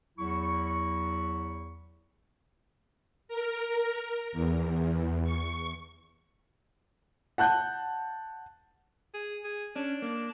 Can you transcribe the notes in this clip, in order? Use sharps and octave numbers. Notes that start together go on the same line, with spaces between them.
E2 F#3 E4 C#6
A#4
E2
C#6
F#5 A5 F#6 G6
G#4
G#4
C#4 D4
A#3